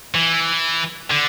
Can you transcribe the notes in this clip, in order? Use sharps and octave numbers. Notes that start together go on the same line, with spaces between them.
E3
D3